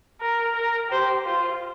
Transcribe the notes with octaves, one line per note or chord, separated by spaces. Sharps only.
A#4
A#4
G4 C5
F4 C5